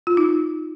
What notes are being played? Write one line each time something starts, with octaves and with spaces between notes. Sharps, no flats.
F4
D#4